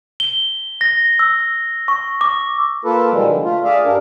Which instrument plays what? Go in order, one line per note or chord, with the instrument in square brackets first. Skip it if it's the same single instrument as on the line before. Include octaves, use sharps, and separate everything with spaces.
[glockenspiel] G7
A#6
E6
C#6
D6
[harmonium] A#3 F4 A4 B4
B2 D#3 F3 G3 G#3
D3
A3 F4
G#4 D5 E5 F5
G2 G3 D4 A#4